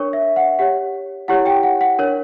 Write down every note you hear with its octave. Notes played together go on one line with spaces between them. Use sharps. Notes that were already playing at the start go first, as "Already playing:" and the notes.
Already playing: D4 A#4 C#5 C#6
E5
F#5
G4 C#5 F#5
E4 G4 C#5 F#5
G4 G5
F#5
F#5
D4 A#4 C#5